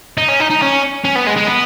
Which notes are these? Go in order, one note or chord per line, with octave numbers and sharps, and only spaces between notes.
D#4
C#4
D#4
D#4
C#4
C#4
B3
G#3
G#3
B3